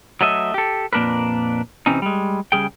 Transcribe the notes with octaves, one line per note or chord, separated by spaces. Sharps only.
F#3 A3 D#5 E5
G4 A4
F2 A#2 A#3 D4 A#4 B4
C3 E3 C4 C#4 D#4
G3 G#3
C#3 G3 G#4 G5